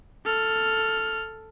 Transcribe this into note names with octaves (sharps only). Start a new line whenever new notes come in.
A4 F6